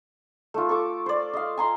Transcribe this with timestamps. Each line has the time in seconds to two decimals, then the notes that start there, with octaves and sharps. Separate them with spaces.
0.54 A3 F4
0.69 A4 C#6 D6
1.06 C5 D5
1.33 D#5 F5
1.58 G#5 A#5 C6